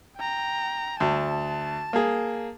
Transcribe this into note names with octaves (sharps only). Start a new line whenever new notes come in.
G5 A#5
D2 A5
A#3 G#4